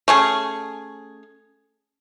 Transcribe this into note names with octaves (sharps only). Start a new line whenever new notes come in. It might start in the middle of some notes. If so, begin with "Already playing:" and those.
A3 C#4 G#4